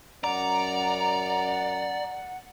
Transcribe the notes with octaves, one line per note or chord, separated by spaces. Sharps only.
F#2 D5 F#5 A#5